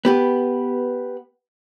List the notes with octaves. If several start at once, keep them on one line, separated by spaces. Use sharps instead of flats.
B3 G4 B4